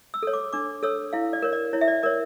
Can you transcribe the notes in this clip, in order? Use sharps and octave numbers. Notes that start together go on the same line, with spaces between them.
E6
A4 C#5
D6
D4 D6
A4 C#5 E6
E4 F5
D5
A#4 C#5
D5
E4 C#5
E5
D5
A#4 C#5 D5